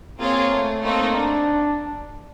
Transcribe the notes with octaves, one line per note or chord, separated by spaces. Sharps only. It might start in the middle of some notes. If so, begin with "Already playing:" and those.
A#3 C4 F4 G#4 C#5
A3
A3 A#3 C4 D#4
D4